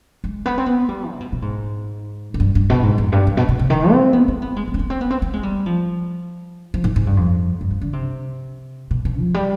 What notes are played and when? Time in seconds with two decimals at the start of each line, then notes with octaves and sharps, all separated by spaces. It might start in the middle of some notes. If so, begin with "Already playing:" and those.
0.24 G#3
0.46 B3
0.58 C4
0.66 B3
0.89 G3
1.10 C3
1.20 B2
1.32 B2
1.42 G#2
2.34 G#2
2.40 G2
2.55 G2
2.70 B2
2.83 G#2
2.98 F2
3.12 G2
3.27 G2
3.37 B2
3.49 B2
3.59 C3
3.70 D#3
3.92 C4
4.13 B3
4.28 C4
4.42 B3
4.56 G#3
4.68 B3
4.74 C4
4.79 B3
4.90 C4
5.01 B3
5.11 C4
5.22 B3
5.33 G#3
5.43 G3
5.66 F3
6.74 F3
6.84 G#2
6.96 G#2
7.07 G2
7.17 F2
7.61 G2
7.71 F3
7.81 D3
7.93 C3
8.91 B2
9.05 B2
9.19 F3
9.34 G3